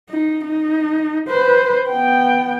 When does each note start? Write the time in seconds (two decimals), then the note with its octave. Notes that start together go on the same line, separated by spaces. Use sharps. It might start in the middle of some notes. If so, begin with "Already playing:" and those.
0.10 D#4
0.45 D#4
1.29 B4 C5
1.90 B3 G5